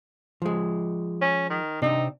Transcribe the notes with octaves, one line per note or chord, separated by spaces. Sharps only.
F3 G#3
C#4
D#3
C3 C4 D4 D#4